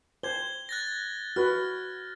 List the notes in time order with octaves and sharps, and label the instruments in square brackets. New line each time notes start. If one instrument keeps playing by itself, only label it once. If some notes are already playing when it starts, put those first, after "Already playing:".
[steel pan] C5 [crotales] G#6 G7
[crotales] F#6 A6 A#6
[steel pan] F#4 B4 [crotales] F6